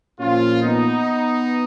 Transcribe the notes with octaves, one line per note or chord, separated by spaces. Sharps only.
A#2 F3 C#4 F4
B3 D#4